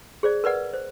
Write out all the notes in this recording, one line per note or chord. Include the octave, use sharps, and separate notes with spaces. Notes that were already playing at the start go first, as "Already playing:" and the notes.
G#4 C5 D5
A#4 B4 D5 F#5
C5